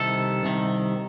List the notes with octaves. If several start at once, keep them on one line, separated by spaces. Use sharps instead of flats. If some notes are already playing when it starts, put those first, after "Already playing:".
Already playing: C2 C3 D#3 A4
C2 C3 D#3